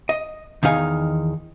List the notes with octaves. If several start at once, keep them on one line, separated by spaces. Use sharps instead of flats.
D#5
E2 D#3 D#4 F5 G#5